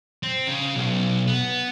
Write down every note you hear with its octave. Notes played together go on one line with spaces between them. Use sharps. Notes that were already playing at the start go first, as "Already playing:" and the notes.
C4
C#3
B1
B3